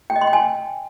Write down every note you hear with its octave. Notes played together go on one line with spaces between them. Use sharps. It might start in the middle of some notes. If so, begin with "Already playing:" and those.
G5
D#5
C6
G5
G#5